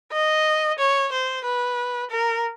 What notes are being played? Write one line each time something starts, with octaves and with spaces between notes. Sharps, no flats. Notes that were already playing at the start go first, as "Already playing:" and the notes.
D#5
C#5
C5
B4
A#4